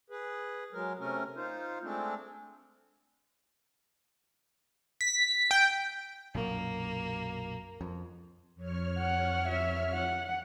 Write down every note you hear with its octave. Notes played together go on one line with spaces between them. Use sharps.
G#4 B4
F#3 G#3 A#4
C3 A3 C#4 A#4
D#4 F4 C5
G#3 A3 C4 D4
B6
G5
B1 F#2 A#2 A#3
F2
F2 C#5 F6
F#5
E5
F#5